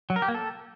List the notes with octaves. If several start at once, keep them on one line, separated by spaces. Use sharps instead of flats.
F#3
A#4
G4
A#3
A4